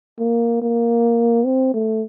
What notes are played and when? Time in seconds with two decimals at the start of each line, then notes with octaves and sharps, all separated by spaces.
0.19 A#3
0.62 A#3
1.45 C4
1.74 A3